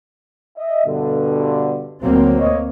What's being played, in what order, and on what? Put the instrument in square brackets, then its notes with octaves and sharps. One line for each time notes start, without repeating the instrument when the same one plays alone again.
[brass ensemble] D#5 E5
G2 B2 D3
[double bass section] D2 A#3 C4 [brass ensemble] F#3
[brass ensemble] C#5 D#5